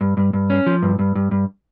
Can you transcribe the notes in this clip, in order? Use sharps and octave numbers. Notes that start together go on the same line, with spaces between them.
G2
G2
G2
C#4
F3
G2
G2
G2
G2